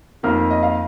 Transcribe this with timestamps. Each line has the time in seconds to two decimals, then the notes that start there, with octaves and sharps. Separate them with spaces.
0.23 F2 D#3 A#3 F6
0.51 D#5
0.63 F5